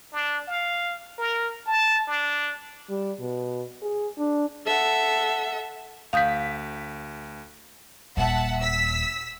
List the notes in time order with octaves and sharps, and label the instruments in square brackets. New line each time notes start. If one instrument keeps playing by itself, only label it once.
[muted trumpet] D4
F5
A#4
A5
D4
[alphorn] G3
B2
G#4
D4
[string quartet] A4 E5 F#5
[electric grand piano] D2 B6 [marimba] F5 D#6 G6
[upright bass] D#1 [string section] E5 F#5 A5
[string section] E6 B6